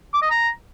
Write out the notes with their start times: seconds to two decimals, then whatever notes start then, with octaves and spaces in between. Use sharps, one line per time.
0.14 D6
0.22 D#5
0.30 A#5